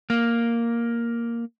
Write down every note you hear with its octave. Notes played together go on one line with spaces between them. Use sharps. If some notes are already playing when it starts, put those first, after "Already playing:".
A#3